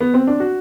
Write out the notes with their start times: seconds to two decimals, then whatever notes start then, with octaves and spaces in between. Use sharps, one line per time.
0.01 B3
0.14 C4
0.27 D4
0.40 F#4